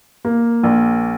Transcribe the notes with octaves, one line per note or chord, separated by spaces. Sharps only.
A#3
A#1